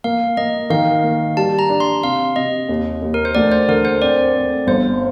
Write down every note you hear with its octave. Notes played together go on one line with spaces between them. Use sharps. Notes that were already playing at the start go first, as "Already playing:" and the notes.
A#3 F5
A#3 D#5
D#3 F5
A#3
G3 A5
A#5
D4
C6
C3 F5
C3 D#5
D#2
D#2
A#4
C5
D2 D5
C5
D3 A#4
C5
C4 D5
C4
G1 C5